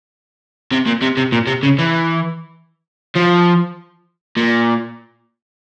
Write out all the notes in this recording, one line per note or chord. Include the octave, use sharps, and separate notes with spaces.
C3
A#2
C3
C3
A#2
C3
C#3
E3
F3
A#2